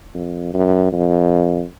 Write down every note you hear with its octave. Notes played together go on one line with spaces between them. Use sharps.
F2
F#2
F2